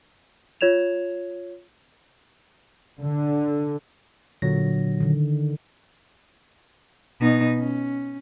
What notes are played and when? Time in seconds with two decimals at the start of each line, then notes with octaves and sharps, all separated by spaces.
0.61 F4 C#5 G#6 E7 F7
3.00 D3
4.42 A#2 D3 F#3 A#6
5.00 D3 D#3
7.21 B2 D#4
7.57 C#4